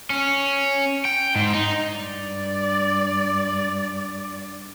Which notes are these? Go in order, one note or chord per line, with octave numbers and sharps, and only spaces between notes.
C#4
G5
G#2
D#4
G2 D5